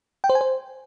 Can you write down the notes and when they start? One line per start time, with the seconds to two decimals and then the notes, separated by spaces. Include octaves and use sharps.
0.24 G5
0.30 C5
0.35 G#5
0.41 C5